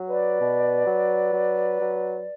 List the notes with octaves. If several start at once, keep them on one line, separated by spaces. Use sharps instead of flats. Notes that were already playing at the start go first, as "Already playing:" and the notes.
Already playing: F#3
B4 D5
B2
F#3
F#3
F#3